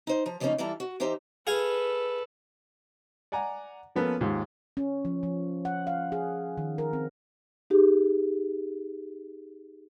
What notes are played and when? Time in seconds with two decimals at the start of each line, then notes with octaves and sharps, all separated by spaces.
0.07 D#4 C5
0.26 F3 A#5
0.40 C#3 F3 A#3 C4 C#4 D#4
0.58 E3 G3 E4 F4 A4 A#5
0.80 F#4
1.00 E3 D#4 G4 C5 A#5
1.47 G#4 A4 B4 F5 G#5
3.32 D5 F#5 G#5 A#5
3.95 F3 A#3 B3 C#4 A4 B4
4.21 D#2 G#2 F4 G4
4.77 C#4
5.05 F3
5.23 F3
5.65 F#5
5.87 F5
6.12 G#4
6.58 D#3
6.78 A#4
6.93 C4
7.70 D#4 G4 G#4